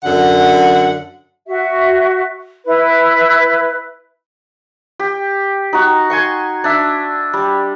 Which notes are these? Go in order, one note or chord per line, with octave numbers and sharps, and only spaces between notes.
F#2 D3 F#5
F#4 E5
E4 B4
G4
D#4 F#4
G#5 C6 C#6
D4 E5
G3